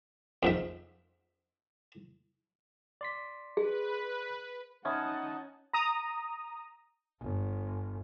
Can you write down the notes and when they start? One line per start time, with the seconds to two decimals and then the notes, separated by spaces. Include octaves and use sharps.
0.43 F2 G#2 E5
3.01 D5 C6 B6
3.57 G#4 B4
4.85 C#4 D#4 E5 F#5 A5 B5 D#6
5.73 A#5 D#6
7.21 G1